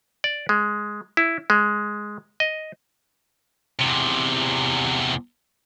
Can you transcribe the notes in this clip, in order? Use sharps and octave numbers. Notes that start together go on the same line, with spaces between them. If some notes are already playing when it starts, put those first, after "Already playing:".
D5
G#3
E4
G#3
D#5
E2 C3